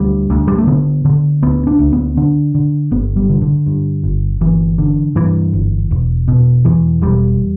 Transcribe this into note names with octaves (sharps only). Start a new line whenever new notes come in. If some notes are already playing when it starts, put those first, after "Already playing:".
Already playing: D2 G3
D2
G3
A3
D3 B3
D3
D2 B3
D4
D2
B3
D3 D4
D3
G1 B3
G3
D3
D3
G2
G1
G1 E3
D3
G2 E3
G1
E1
B2
E2 E3
E1 G3